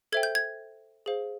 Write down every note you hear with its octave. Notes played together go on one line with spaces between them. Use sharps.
A4 C5 E5 G5 G#6
G6
G#6
G#4 C5 F5